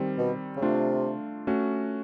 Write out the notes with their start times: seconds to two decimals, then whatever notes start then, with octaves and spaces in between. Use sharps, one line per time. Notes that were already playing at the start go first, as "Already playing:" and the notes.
Already playing: D#3 G3 C4
0.18 B2
0.56 C#3
0.62 C3 A3 D4 F4
1.47 A3 C#4 F#4